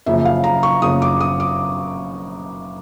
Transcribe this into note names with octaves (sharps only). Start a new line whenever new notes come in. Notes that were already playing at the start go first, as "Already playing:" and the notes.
F#1 F#2 C#3 F3 E5
F5
A#5
C#6
F#1 F#2 C#3 F3 D#6
D6
D#6
D6